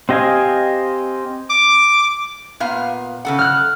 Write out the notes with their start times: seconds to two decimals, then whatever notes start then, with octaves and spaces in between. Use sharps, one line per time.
0.09 C4 G4 D#5 F5 G#5
1.50 D6
2.60 A#2 B3 F5
3.25 C#3 A4 F#5
3.39 F6 F#6